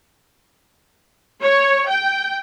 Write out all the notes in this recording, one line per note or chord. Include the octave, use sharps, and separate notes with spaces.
C#5
G5